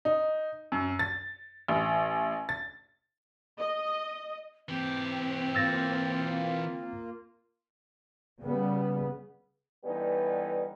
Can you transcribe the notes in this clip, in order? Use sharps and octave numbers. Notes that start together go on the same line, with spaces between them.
D#4
F#2
A6
A1
A6
D#5
E3 C4 G4
A#3 F4 E6 A6 A#6
C#3 G3 B3
D3 E3 G3 B3 C#4 D#4